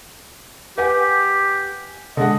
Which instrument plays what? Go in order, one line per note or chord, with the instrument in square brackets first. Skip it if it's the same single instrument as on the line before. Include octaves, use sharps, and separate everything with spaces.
[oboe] G4 [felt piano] B4 F#5 G#5
[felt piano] D3 G#3 F#5 [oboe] D#5